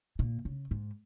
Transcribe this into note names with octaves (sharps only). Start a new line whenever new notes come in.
A#2
C#3
G#2